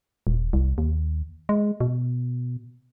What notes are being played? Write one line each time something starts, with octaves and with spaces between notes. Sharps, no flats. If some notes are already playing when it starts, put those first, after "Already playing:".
D#1
C2
D#2
G#3
B2